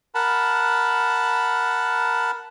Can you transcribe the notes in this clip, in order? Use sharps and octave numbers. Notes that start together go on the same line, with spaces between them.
A#4 F#5 A5 B5